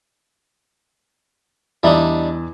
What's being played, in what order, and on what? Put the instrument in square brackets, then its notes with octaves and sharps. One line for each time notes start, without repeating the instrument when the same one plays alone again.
[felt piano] E2 E5 [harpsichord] G3 D4 D#4